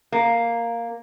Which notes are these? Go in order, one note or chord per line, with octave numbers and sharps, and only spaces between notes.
A#3